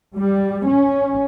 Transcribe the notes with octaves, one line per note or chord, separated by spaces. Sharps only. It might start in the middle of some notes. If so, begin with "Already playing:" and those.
G3
C#4